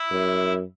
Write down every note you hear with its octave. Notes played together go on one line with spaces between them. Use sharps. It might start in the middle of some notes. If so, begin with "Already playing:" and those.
Already playing: E4
F#2